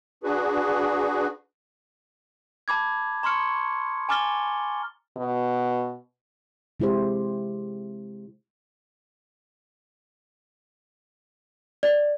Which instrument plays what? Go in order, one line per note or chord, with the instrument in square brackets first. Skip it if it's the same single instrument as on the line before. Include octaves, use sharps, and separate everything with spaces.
[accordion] D4 F#4 G#4 B4
[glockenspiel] A5 B5 D6 G#6
A#5 C6 C#6 F6 C#7
G#5 A#5 D6 F6 A6 G7
[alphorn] B2
[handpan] C3 G#3 E4 G4 C5
[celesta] D5